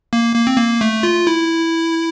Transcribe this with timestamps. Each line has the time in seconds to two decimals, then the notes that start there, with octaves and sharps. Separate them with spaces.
0.13 A#3
0.36 A#3
0.47 C4
0.57 A#3
0.81 A3
1.03 F4
1.27 E4